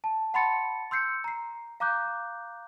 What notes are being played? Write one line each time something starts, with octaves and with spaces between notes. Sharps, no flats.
A5
F#5 A5 B5 C6 A6 C#7
C6 E6 G6 C7 C#7
A#5 C7
F5 A#5 D6 F#6 G6